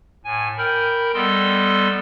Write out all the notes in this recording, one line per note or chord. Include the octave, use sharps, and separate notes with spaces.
A2 G#5
A#4 G5 B5 F6 G6
G3 B3 A4 D#5 C6 E6